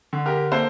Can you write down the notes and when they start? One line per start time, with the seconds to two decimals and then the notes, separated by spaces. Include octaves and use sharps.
0.13 D3
0.26 G4 A#4
0.52 A#3 A4 C5